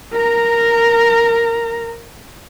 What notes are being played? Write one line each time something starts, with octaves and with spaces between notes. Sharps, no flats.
A#4 A#5